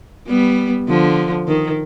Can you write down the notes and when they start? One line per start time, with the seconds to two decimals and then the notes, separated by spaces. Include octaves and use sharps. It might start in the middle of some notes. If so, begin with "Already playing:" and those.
0.28 G3 B3
0.88 D3 F3
1.48 D#3